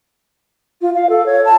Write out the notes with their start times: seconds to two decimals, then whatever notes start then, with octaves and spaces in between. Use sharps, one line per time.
0.81 F4
0.94 F5
1.09 A4
1.25 C#5
1.44 A5